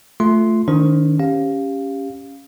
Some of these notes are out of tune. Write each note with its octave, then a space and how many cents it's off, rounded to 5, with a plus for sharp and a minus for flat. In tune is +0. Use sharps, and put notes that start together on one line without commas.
A3 +0 F4 +0 C6 +0
D#3 +0 D4 -40 C5 +5
C#4 +0 G4 +10 F5 +0